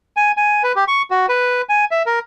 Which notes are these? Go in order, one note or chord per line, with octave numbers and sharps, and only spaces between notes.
G#5
G#5
B4
G4
C#6
F#4
B4
G#5
E5
A#4